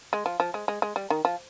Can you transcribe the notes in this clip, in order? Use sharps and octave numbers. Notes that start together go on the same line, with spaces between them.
G#3
F3
F3
G#3
G#3
G#3
G3
D#3
F3